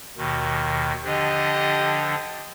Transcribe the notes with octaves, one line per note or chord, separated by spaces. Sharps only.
D#2 B2 D#3
D3 F3 D4 G4 D#5